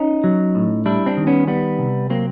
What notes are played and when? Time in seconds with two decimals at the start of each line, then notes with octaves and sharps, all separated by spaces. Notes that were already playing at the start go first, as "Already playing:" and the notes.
Already playing: C#4 D#4
0.24 F#3
0.55 A2
0.86 G3 D4 E4
1.06 C4 D4
1.17 D#3
1.27 B3 C#4
1.47 G3 B3
1.79 C3
2.10 F#3 A#3 C4